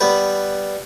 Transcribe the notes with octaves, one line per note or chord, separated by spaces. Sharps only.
G3 B3 B4